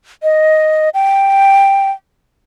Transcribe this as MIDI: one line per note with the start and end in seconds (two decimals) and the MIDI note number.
0.23 0.89 75
0.94 1.91 79